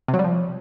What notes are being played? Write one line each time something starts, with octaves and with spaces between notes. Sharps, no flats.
C3
F#3
G3
F3